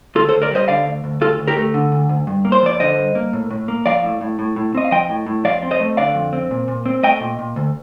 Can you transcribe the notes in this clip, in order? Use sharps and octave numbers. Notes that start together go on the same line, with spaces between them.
D2 F4 A4
A4 C5
D2
A#4 D5
G3 C5 D#5
D3 D5 F5
D2
D2
D2 F4 A4
D2
G4 A#4
A3
D3
D2
D2
G2
A#3
C5
F3 D5
D3 C5 D#5
G2
A#3
A2
A2
A#3
F3 D5 F5
A2
A2
A2
A2
C4 D#5
F5
F3 D#5 G5
A2
A2
F2 D5 F5
C4
C5 D#5
A3
D3 D5 F5
F2
C4
A#2
A#2
C4
A3 D#5 G5
A#2
A#2
D2